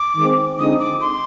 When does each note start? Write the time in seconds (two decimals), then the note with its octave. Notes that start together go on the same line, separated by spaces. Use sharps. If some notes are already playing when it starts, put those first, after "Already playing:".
Already playing: D6
0.16 D#3 G#3 C4
0.58 D3 F3 G#3 C4 D#4 D#6
0.80 D6
1.01 C6